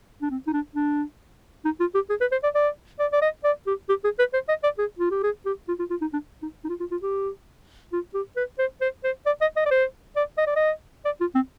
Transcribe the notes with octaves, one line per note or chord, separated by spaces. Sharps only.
D4
C4
D#4
D4
D4
D#4
F4
G4
G#4
B4
C5
D5
D5
D5
D5
D#5
D5
G4
G4
G#4
B4
C5
D#5
D5
G#4
F4
G4
G#4
G4
F4
F4
F4
D#4
D4
D#4
D#4
F4
F4
F4
G4
F4
G4
B4
C5
C5
C5
D5
D#5
D#5
D5
C5
D5
D#5
D5
D#5
D5
F4
C4